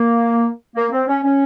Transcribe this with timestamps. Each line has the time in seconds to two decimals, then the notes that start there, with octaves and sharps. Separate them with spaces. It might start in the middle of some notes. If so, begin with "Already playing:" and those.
Already playing: A#3
0.75 A#3
0.91 C4
1.07 C#4
1.22 C#4